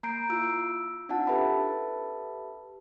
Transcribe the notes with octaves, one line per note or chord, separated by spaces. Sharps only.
A#3 A#5 G6 C7 D7
E4 F4 E6 D7
C4 D4 D#4 F4 F#5 A5
G4 A4 B4 E5 A5 B5